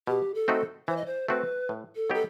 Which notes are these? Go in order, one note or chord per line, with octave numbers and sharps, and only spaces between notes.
B2 G4
A4
A3 C4 D#4 F#4
E3 C5
D#5
C5
A3 C4 F#4 B4
A2
A4
F#3 B3 D#4 G4 A4